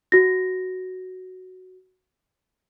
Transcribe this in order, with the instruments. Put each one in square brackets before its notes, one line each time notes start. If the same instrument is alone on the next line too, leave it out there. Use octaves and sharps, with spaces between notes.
[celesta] F#4 A#6